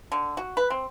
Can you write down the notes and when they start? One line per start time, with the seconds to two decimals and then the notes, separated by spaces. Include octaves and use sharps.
0.12 D3
0.37 F#4
0.57 B4
0.70 C4